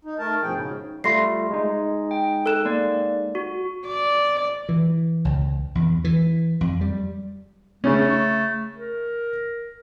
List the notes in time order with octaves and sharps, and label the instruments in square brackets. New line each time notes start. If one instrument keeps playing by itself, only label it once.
[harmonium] D#4
A3 A#4 A5
G2 B2 F3 G#4 G5
G#2 C#3
[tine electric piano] G3 A3 F4 [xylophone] C6 A#6 C7
[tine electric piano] G#3 D#4
[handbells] G5
[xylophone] A4 F#6 E7
[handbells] A#3 D5
F#4
[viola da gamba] D5
[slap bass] E3
C#2
E2
E3
F2
G3
[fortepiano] C#3 C#4 [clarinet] A3
[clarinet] A#4